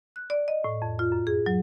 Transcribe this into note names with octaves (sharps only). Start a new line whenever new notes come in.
F#6
D5
D#5
A2
F2
F4
F#2
G#4
F#3